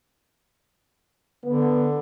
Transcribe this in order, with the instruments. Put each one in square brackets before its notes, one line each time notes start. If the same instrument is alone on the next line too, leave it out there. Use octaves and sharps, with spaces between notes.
[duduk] D3 [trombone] B3